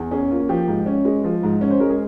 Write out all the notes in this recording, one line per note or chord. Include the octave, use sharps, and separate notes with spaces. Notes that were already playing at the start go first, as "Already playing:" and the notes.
Already playing: E2
C#4 G#4
A#3 F4
F3 G4
G#2
C#4
G#3
F3
G#2
C#4
C5
G#3 A#4
G#4